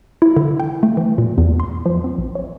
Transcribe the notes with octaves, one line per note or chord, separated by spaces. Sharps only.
E4
D3
G5
A3
E3
A#2
E2
C6
F3
C4
A#1
C#5